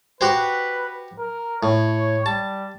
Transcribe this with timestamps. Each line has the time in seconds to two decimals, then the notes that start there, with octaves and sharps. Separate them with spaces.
0.21 F#4 G4 B4 C5
1.18 A#4
1.63 A2 C#5
2.26 G3 A5